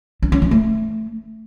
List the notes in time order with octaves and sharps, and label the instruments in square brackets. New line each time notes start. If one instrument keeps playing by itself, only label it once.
[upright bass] D4
C#4
E3
A3